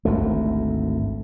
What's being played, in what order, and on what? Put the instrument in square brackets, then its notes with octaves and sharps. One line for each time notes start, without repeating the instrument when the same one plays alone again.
[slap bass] G#1 D2 A3